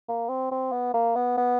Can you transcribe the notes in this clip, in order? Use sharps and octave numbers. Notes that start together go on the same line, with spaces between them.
A#3
C4
C4
B3
A#3
B3
B3